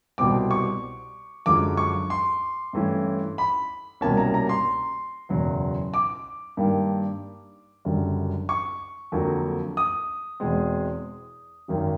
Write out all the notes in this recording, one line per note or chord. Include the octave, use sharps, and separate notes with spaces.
C2 B2 G3 C4 D6
C#6
F#2 D3 F3 G#3 D6
C#6
C6
G2 E3 A3 C#4
B5
C2 B2 G3 A#3 C#4 A5
A#5
A#5
C6
F#1 E2 B2 F#3
D6
G2 D#3 G3 A#3
F#1 F#2 D3 G3
C#6
F2 D3 F#3 A#3
D#6
E2 B2 G#3 C4
G#1 F#2 D#3